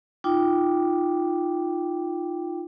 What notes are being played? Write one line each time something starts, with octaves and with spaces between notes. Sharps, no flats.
D#4 F4 G5 D6